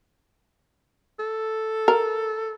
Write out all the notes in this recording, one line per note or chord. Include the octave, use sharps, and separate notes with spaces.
A4
A#4